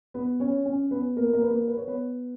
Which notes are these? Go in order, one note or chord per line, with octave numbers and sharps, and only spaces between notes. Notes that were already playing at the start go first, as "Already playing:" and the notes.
B3 B4
C#4 C#5
C#4 C#5
B3 B4
A#3 A#4
A#3 A#4
B4
A#3 A#4
B4
C#5
B3 B4